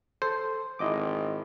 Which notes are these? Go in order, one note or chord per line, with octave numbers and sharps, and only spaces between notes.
A4 C5
G#1 E4 D#5 D6